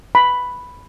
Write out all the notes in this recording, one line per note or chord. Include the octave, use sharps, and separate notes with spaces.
B5